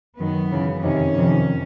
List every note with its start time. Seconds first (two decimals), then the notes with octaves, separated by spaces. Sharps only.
0.18 F#2 D#3 B3
0.50 F#2 C#3 E3
0.82 F2 C3 D#3 C#4
1.13 F2 C3 D#3